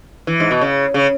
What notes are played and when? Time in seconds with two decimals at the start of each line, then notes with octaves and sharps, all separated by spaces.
0.27 E3
0.40 G#2
0.51 B2
0.61 C#3
0.94 C#3